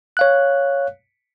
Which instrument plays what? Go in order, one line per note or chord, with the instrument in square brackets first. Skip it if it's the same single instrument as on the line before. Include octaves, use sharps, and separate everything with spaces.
[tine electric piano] C#5 F5 F#6